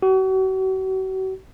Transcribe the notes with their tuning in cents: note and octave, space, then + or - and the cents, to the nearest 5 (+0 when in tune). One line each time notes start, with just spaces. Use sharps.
F#4 +40